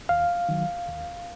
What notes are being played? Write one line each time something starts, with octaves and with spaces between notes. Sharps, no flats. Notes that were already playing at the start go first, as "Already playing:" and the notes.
D#2 F5
D#3 F#3
D#2